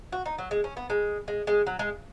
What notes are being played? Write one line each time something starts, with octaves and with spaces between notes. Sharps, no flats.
F#4
D#4
F#3
G#3
C#4
B3
G#3
G#3
G#3
F#3
G#3